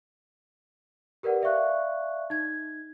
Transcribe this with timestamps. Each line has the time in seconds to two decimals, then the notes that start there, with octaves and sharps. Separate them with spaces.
1.23 G4 A#4 B4 D5 F#5
1.42 D5 E5 F5 C#6 F#6
2.30 D#4 G#6